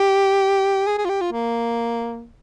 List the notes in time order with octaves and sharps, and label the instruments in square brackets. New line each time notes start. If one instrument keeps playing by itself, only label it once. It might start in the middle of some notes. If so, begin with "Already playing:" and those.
Already playing: [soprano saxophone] G4
G#4
G#4
F4
G4
F4
A#3